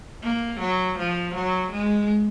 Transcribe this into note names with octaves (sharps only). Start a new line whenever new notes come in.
A#3
F#3
F3
F#3
G#3